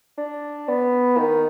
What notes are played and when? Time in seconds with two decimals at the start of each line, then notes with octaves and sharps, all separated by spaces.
0.18 D4
0.69 B3
1.18 D#3